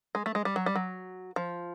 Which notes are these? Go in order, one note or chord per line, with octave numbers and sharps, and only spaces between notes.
G#3
A3
G#3
G3
F#3
G3
F#3
F3